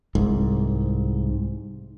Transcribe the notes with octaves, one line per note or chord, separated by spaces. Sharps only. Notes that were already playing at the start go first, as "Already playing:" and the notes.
C2 G#2